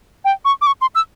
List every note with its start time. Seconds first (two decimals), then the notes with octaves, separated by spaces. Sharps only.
0.25 G5
0.45 C#6
0.61 D6
0.67 C#6
0.81 C6
0.95 E6